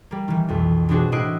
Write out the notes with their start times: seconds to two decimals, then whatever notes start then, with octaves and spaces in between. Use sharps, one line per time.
0.11 G3 A#3
0.28 D#3 E3
0.48 B1 F2
0.89 B2 E3 C4 D4 F#4 G#4
1.12 A2 E4 D#5 F#6 C7 D7